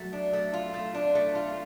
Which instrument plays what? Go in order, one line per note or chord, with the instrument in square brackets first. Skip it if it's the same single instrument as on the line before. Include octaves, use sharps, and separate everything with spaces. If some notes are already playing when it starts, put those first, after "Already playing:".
Already playing: [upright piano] F#3 [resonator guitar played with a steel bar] A3
[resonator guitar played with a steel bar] D4
A3
F4
A3
D4
A3
F4